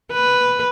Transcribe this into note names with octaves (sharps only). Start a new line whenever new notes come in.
B4